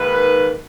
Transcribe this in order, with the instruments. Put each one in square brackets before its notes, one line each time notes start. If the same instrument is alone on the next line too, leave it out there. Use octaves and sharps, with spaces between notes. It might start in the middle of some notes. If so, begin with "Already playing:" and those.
Already playing: [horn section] G#2 D#3 A#3 B4